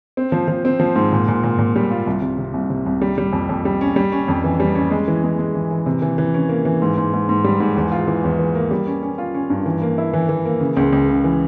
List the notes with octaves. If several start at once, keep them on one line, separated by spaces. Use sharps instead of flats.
C4
F3
F3
C4
F3
G#2
A#2
A#2
A#2
A#2
G3
F4
C2
C3
C3
C2
C3
C2
G3
G3
F2
F2
G3
C#4
G3
C#4
F2
E3
G3
C#4
G#3
E3
G#3
G#3
E3
E3
C3
E3
E3
C#4
A#3
E3
G#2
G#2
G#2
G#2
G3
G#2
E2
F4
E3
E2
E3
A#3
G3
C#4
C#4
F4
C#4
G2
E3
A#3
E4
E3
E3
A#3
C#3
C#2
C#2
C#3
E3